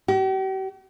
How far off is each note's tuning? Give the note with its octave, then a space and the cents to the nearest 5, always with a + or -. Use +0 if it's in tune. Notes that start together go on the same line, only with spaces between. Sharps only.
G4 -45